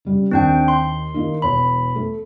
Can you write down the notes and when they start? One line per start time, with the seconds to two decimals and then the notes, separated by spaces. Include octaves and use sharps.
0.05 C#3 G3
0.31 D#2 C4 D4 G5
0.68 C6
1.14 D#3 A#3 D#4
1.42 E1 C#5 B5
1.96 A3